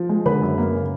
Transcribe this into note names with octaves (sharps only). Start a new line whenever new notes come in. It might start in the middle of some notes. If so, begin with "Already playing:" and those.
Already playing: F3
G#3
D3 B4 B5
F#2
A#3
C#3